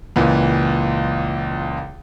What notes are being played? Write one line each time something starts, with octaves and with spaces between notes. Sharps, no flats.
C#2 A#2 E3